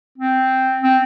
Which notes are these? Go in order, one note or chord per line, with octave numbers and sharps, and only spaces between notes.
C4
C4